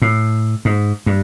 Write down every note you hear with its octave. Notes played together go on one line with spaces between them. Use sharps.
A2
G#2
G2